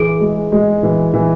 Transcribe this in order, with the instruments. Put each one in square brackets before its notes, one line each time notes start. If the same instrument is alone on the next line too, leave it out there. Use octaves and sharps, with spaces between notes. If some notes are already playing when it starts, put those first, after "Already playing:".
Already playing: [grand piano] E3 [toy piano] G#4
[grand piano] G#3
G#3
E3
E3